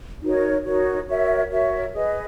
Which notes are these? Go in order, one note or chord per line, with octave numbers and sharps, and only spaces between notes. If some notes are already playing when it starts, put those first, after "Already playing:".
D#4 F#4 A#4 C#5
D#4 F#4 A#4 C#5
F#4 A#4 C#5 E5
F#4 A#4 C#5 E5
G#4 B4 D#5